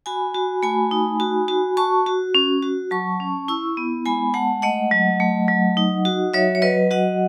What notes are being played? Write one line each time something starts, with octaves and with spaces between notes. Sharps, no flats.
F#4 G#5 B5
F#4
A3 G#5 B5
D#4
F#4
F#4
F#4 A5 C#6
F#4
C#4
F#4
F#3 A5 C#6
C#4
E4 C#6 E6
B3
G#3 G#5 B5
G#3 F#5 A5
A3 D#5 F#5
F#3
A3
F#3
D#4
F#4
F#3 C#5 E5
C#5
F#3 B4 D#5
F#4 D#5 F#5